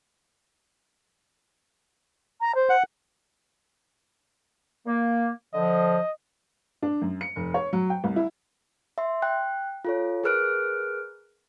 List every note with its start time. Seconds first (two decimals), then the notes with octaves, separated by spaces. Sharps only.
2.41 A#5
2.55 C5
2.70 F#5
4.86 A#3
5.54 D3 F3 D#5
6.82 D4
7.02 F#2
7.21 C#7
7.36 F1
7.54 C#5
7.73 F#3
7.90 G5
8.04 C2
8.16 E4
8.98 E5 C6
9.22 G5 F#6
9.85 F4 A4 C#5
10.24 G#4 A#4 B4 F6 F#6 D7